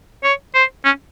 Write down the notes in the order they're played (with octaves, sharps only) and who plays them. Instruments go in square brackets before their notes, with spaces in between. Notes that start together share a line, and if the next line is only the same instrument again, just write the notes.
[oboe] C#5
C5
C#4